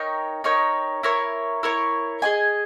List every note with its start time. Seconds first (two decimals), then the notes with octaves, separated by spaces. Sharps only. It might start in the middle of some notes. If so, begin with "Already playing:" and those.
Already playing: D#4 A#4 C#5 G5
0.44 D#4 A#4 C#5 G5
1.03 E4 A#4 C#5
1.63 E4 A#4 C#5
2.22 G#4 D#5 G#5